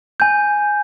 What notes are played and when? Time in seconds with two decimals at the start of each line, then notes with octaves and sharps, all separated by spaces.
0.20 G#5 G6